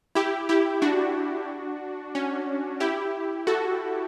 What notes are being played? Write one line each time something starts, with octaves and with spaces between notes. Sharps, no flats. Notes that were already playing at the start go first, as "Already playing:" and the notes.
E4 G4
E4 G4
D4 F#4
C#4
E4 G4
F#4 A4